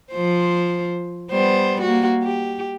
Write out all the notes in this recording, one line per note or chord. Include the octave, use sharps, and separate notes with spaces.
F3 C5
G3 B3 C5
A#3 F#4
G4